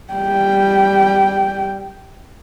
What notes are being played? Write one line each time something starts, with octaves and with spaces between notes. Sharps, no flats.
G3 G5